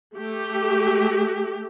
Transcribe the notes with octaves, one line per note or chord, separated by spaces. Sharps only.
A3 G4